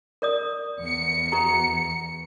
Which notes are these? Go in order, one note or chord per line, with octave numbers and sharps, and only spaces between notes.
A#4 D5 D#6
E2 C#7
F#4 G#4 A#5